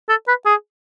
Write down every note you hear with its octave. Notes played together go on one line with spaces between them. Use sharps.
A4
B4
G#4